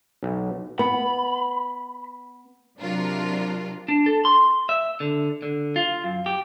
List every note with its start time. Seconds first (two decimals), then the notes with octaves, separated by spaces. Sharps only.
0.23 B1
0.79 B3 B5
2.78 C3 F#3 D4 F4 A#4
3.88 D4
4.06 A4
4.25 C6
4.69 E5
5.00 D3
5.42 D3
5.76 F4
6.04 F#2
6.26 G4